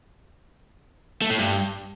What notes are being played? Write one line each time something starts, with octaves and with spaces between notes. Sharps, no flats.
A3
A2
G2